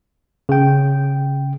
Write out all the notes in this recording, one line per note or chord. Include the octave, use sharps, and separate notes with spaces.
C#3 G5